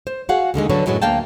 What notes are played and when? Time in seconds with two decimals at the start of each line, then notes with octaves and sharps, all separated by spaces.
0.07 C5
0.29 F#4 G#4 F5 F#5
0.54 D#2 D3 D#3 G#3
0.69 D3 F#3 D4 B4 C#5
0.86 F#2 A2 F#3 G#3 B3
1.02 D2 A#3 F5 G5 A5